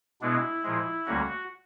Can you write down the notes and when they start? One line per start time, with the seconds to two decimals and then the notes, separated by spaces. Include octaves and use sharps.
0.21 B2 G#3 B3 D4 E4
0.63 A#2 F3 G#3
1.06 D2 D3 G3 A#3 C#4 F#4